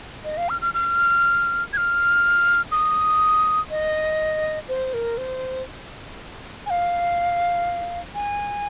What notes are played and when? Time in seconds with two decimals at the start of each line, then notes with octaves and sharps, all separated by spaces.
0.25 D#5
0.37 F5
0.49 F6
0.61 F6
0.74 F6
1.73 G#6
1.77 F6
2.72 D#6
3.70 D#5
4.68 C5
4.94 A#4
5.18 C5
6.66 G#5
6.70 F5
8.15 G#5